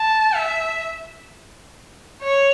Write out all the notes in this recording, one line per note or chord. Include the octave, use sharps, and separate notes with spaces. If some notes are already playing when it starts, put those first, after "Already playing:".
Already playing: A5
E5
C#5